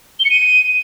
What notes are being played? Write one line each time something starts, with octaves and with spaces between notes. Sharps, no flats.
G7
C#7
D#7